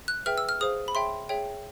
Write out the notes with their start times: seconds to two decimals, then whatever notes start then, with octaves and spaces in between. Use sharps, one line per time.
0.08 F#6
0.26 G#4 B4 E5 G5 F6
0.38 E6
0.49 F6
0.61 G#4 C5 F5 D#6
0.88 B5
0.95 G#4 C#5 E5 G5 C6
1.29 G#4 C#5 E5 G5